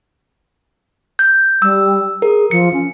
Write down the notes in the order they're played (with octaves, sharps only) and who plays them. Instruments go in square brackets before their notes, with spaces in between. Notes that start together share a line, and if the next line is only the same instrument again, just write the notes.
[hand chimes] G6
[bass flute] G3 [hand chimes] E6
[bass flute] G#4 [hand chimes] A#4
[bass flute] F3 [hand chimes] C#7
[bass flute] C#4